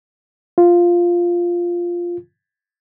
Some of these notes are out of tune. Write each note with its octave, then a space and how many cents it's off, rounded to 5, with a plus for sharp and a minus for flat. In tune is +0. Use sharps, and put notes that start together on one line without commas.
F4 +0